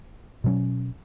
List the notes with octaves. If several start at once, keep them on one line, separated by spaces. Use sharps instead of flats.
B2 F#3 C#4